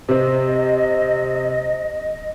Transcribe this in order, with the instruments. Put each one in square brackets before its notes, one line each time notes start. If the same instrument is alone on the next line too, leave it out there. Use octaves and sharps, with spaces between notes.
[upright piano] C3 C4 [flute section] D#5